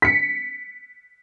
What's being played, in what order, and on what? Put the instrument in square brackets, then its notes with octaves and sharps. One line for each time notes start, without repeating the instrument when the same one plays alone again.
[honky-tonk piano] B6 C#7